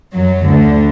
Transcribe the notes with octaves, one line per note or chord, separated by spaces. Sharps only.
F#2 F#3
D2 D3